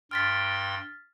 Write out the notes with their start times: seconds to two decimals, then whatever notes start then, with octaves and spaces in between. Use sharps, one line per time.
0.11 G2 G5 C6 F6 A6 B6